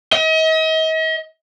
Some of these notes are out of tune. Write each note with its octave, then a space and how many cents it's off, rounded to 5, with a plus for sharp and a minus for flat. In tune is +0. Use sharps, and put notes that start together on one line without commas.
D#5 +40